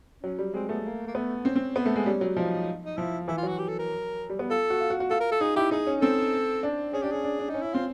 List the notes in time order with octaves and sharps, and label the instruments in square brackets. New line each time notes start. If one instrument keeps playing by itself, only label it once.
[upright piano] F#3 [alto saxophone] C#4
[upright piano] G3
[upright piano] G#3 [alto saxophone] C4
[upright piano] A3 [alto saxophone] B3
[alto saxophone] A#3
A#3
[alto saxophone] A3 [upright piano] B3
[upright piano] C4 [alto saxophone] C#4
[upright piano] C4
B3
A3
G#3
[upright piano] G3 [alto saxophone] C#4
[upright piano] F#3
[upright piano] F3 [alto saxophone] D#4
[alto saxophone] D#4
[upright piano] F3 [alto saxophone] E4
[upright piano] E3 [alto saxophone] E4
[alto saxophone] F4
[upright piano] F#3 [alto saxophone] F#4
[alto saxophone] G4
A4
A#4
[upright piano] G3
B3
[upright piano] F4 [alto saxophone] A4
[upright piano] F#4
F4
F#4
F#4
[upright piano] F4 [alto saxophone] A4
[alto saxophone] A#4
A4
[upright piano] D#4 [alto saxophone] G#4
[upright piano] E4 [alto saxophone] G4
[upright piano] D#4 [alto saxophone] G#4
[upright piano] C#4
[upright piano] C4 [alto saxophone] A4
[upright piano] D4
[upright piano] C#4 [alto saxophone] G#4
[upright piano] D4 [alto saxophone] G4
[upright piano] C#4 [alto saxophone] G#4
[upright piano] D4
D4
[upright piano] C#4 [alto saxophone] D#4
[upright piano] C#4 [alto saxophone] E4
[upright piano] C4 [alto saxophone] F4